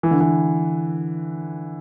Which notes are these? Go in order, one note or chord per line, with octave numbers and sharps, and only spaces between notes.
E3
D3
E3